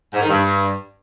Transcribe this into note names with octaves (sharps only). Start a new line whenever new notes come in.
G#2
D#3
G2